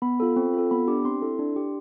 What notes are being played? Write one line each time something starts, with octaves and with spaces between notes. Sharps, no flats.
B3 B5
F4 A4
C4
F4 A4
B3 B5
D4 G4 D6
C4 C6
E4 A4
D4
G4